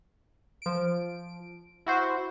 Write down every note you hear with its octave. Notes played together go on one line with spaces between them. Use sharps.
F3 D7
E4 F#4 C5